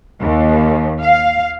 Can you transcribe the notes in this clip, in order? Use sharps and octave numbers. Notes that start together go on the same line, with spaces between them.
D#2
F5